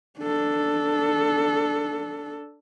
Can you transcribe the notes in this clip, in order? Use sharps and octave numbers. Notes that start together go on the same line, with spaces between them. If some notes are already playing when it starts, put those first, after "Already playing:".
D4 A4